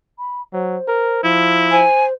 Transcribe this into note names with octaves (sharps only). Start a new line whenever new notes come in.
B5
F#3 C5
A#4
F3 E4
C5 G#5